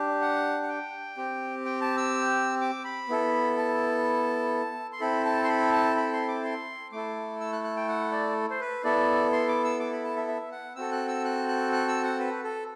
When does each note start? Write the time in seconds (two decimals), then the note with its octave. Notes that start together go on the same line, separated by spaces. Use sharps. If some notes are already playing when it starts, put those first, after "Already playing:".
Already playing: D4 G4
0.21 F#5
0.63 F#5
0.69 G5
1.17 C4 G4
1.65 G5
1.81 A5
1.97 E6
2.61 D6
2.84 B5
3.09 B3 E4 A4
3.57 A5
4.92 C6
5.00 C4 E4 A4 B5
5.25 A5
5.44 C6
5.48 B5
5.72 A5
5.97 B5
6.13 C6
6.28 D6
6.44 C6
6.92 A3 E4 A4 D6
7.41 E6
7.53 F#6
7.64 F#6
7.76 G5
7.89 F#5
8.12 D5
8.50 C5
8.60 B4
8.84 B3 E4 A4 D5
9.33 C6
9.48 D6
9.64 E6
9.80 D6
9.92 B5
10.04 A5
10.17 E5
10.28 E5
10.52 F#5
10.76 C4 F#4 A4 E6
10.92 F#6
11.08 E6
11.25 F#6
11.49 F#6
11.73 F#6
11.88 E6
12.03 F#5
12.19 B4
12.44 A4